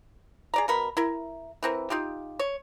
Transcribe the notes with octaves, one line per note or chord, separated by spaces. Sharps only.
G#4 D5 A#5
B2 A#4 B5
E4 A#4
E3 C4 A#4
D#4 F4 G4
C#5